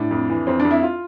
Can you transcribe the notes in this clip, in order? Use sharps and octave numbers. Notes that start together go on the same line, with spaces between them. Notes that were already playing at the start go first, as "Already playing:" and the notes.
Already playing: A2 D4
F2
E3
F2 C4
D4
F2
E4
F4